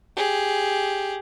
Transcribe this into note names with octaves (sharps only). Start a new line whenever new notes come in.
G4 G#4